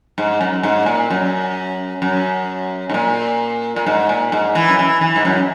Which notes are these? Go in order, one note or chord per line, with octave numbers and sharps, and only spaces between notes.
G#2
F#2
G#2
A#2
F#2
F#2
G#2
A#2
A#2
G#2
A#2
G#2
E3
F#2
E3
E3
G#2
F#2